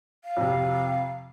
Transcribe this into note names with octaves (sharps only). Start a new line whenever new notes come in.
F5
F2 C3